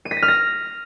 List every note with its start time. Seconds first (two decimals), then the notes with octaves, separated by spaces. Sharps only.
0.05 D#7
0.11 B6
0.17 A#6
0.22 F6
0.28 A#6